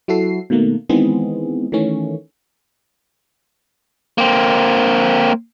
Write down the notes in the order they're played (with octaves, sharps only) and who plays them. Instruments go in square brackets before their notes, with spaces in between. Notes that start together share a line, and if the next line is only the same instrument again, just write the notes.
[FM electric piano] F#3 E4 F#4 A4 C7
B2 D#3 A3 A#3
D#3 E3 G#3 B3 C4 G#4
D#3 E3 A3 C#4
[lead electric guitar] A#3 C4